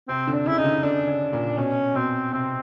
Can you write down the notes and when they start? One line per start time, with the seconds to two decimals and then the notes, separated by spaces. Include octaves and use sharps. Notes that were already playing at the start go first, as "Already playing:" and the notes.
0.08 C3 C4
0.27 D3
0.34 D4
0.46 C#3 E4
0.58 C#3 D#4
0.64 D3
0.83 D3 D4
1.08 C#3
1.33 A#2
1.58 B2 C#4
1.95 B2 C4
2.33 C3 C4